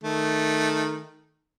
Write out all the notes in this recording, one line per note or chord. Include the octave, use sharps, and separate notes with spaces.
D#3 A3